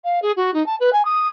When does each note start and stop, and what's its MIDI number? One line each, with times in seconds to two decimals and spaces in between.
0.04 0.20 77
0.22 0.32 68
0.37 0.54 66
0.54 0.65 63
0.66 0.76 81
0.80 0.90 71
0.93 1.05 80
1.05 1.28 87